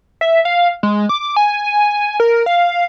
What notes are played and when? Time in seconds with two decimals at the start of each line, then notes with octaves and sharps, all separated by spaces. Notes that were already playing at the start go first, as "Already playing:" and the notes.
0.21 E5
0.45 F5
0.83 G#3
1.09 D6
1.36 G#5
2.20 A#4
2.46 F5